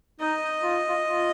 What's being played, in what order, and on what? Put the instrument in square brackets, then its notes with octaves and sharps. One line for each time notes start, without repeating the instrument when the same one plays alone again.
[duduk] D#4 [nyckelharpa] D#5
[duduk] F4
F4
F4